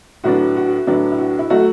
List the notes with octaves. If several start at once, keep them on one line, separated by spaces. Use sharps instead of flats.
A2 F#3 B3 D4 F#4
F#4
A2 F#3 B3 D4 E4
E4
F#4
E4
F#3 A3 F#4